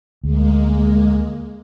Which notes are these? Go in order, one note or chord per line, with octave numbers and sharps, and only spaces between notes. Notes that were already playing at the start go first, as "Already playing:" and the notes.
D2 G#3 A#3